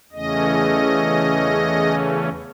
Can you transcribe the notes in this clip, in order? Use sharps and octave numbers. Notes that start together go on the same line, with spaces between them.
E2 C#3 E3 A3 C#4 D#5